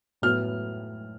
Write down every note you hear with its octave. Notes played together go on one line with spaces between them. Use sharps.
A2 F#3 B3 F6